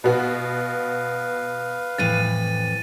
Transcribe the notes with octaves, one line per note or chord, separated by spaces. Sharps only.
B2 B3 F#4 B4 F5
F2 A2 E3 A6 D#7